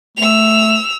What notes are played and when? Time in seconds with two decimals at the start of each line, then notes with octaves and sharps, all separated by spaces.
0.17 A3 E6 F7